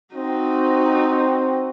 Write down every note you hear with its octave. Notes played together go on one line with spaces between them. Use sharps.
C4 D#4 F#4